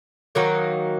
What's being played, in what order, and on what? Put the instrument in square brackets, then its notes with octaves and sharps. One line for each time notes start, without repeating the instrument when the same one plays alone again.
[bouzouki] D#3 F#3 A#3 D#4